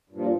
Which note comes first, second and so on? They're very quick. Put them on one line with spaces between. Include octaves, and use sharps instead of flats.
G2 A#2 F3